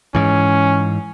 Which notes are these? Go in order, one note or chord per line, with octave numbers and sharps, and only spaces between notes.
G#2 E3 C#4